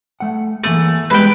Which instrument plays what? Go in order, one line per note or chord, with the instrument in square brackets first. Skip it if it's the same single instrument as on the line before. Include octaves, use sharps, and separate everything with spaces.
[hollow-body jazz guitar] A3 F#5
[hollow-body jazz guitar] E3 A#3 G#4 [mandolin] A3
[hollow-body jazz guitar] G3 G#3 B3 [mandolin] B4 G5